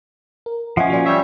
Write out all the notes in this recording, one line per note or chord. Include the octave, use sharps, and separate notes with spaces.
A#4
F3 C#4 D#5 E5 F#5
A#2 F#4 D5
G3 C#5 E5 G6 B6